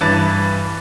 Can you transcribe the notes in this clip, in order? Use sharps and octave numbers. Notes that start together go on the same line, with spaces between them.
G2 E3 B4 A5 A6